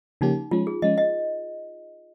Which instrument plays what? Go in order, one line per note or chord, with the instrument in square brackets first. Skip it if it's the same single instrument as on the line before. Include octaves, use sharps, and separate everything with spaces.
[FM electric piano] C#3 F3 A#3 C#4 G4 [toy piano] D#4
[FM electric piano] F3 G#3 C#4 [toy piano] F4
[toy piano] G#4
[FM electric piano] F3 G#3 C#4 [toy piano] D#5
[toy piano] D#5